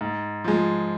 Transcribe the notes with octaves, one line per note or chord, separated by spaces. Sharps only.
G#2
F3 G#3